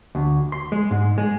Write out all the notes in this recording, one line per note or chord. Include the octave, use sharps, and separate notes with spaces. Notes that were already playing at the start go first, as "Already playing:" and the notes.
D2
C6
G#3
G#2
G#3